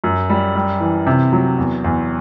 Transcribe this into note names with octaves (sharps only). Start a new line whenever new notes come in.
F#2
G3
G3
E3
C3
F#3
E2
E2